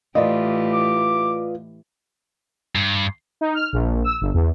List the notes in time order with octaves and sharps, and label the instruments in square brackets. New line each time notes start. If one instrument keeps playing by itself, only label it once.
[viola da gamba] A2 E3 G4 [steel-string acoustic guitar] F4 B4 [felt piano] D5 D#5
[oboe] D6
[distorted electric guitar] G2
[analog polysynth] D#4
F6
A#1
E6
G1
E2